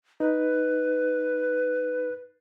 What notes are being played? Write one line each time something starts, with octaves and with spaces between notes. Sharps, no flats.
D#4 B4